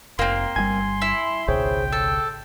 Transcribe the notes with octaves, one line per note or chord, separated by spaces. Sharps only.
F1 A#3 C4 C6
G1 C#3 G3 G#5 G#6
E4
G#1 C#2 B2 G#4 C5 C#5 G5
A4 E6